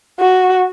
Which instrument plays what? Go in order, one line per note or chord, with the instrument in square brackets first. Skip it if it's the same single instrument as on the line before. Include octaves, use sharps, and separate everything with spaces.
[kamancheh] F#4